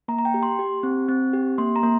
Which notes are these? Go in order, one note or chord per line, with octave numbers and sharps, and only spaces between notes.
A#3 A#5
A#5
G5
G4
C6
G4
C4
C4
G4
A#3 C6
A#5
A#3